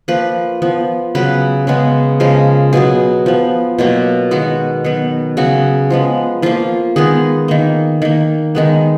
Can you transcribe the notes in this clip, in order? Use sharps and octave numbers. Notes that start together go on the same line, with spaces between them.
F3 A#3 B4
F3 B3
C#3 F#3 B3 B4
C#3 G#3 B3
C#3 F3 G#3 A#4
B2 F#3 B3 G#4
F3 B3
B2 F#3 A#3
D#3 G#3 B3 F#4
D#3 F#3 B3
C#3 F#3 B3 F#4
F3 G#3 B3
F3 A#3 F4
D#3 G#3 B3 G#4
D#3 A#3
D#3 A#3
D#3 G#3 B3